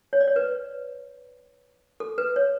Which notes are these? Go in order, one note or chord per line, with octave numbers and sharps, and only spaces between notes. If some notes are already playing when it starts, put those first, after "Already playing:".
C#5
D5
C#5
B4
A4
B4
C#5